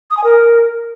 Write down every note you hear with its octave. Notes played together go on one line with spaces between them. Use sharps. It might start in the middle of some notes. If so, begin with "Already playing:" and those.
D#6
G#5
A#4